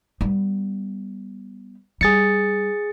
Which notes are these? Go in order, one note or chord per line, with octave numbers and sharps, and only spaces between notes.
G3 B3
G3 G#4 A6 C#7